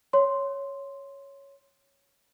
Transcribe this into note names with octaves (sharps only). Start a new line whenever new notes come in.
C#5 C6